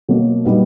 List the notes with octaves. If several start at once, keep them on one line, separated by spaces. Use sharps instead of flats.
B2 F#3 A#3
A#2 G3 B3 D#4